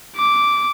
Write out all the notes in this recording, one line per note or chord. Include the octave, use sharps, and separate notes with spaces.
D6